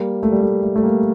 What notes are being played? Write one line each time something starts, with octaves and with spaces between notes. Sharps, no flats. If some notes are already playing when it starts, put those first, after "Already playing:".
Already playing: G3 A#3
A3
G3
A3
A3
A3
G3 A#3